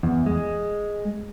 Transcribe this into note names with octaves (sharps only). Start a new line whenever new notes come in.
E2
G#3